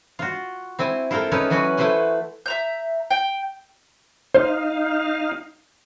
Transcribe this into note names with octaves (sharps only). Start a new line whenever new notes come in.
F4 F#4
C4 E4 G#5
E4 F4 A4 A#4 G5
C#4 D#4 E4 A4 B4 C#5
E3 F#3 C#4 F#4 B4 G#5
A3 E4 B4 C5 F#5 G#5
E5 A#5 G6
G5
D#4 C5 F5